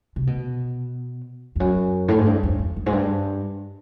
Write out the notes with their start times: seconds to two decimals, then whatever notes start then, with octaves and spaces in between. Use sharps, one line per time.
0.16 C3
0.27 B2
1.56 F2
1.60 F#2
2.08 A2
2.18 G#2
2.26 G2
2.43 F2
2.59 F2
2.76 F#2
2.86 G#2
2.93 G2